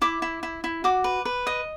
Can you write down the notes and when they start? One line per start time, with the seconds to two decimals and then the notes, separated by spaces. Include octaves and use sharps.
0.02 E4 D6
0.22 E4
0.43 E4
0.64 E4
0.84 F#4 D6
1.04 B4
1.25 B4
1.47 D#5